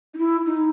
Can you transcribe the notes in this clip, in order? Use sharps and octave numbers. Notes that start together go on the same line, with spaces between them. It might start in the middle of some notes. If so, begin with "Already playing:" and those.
D#4
E4
D#4